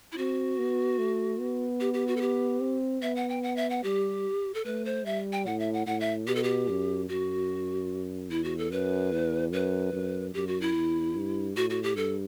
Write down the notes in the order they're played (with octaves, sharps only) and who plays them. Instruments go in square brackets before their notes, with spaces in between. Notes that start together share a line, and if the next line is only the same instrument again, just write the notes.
[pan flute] E4
[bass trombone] C4 [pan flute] F#4
[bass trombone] B3
A3
B3
[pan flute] G4
G4
F#4
A4
G4
[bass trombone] C4
[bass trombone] B3 [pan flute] E5
[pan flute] F#5
G5
F#5
E5
F#5
[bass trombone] G3 [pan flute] G4
[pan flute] A4
[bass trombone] A3 [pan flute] B4
[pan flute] C5
[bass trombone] G3 [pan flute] E5
[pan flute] G5
[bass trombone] A2 [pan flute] F#5
[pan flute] E5
F#5
[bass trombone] A2 [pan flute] F#5
[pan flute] E5
[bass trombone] B2 [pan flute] G4
[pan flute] A4
G4
[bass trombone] F#2
[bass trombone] F#2 [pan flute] F#4
[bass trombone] E2 [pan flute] E4
[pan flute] F#4
A4
[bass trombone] F#2 [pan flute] B4
[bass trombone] E2
[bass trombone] F#2 [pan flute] B4
[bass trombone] F#2
[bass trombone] F#2 [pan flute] G4
[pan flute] F#4
E4
[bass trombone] E2
G2
[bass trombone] A2 [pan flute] F#4
[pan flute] F#4
G4
[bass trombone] G2 [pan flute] A4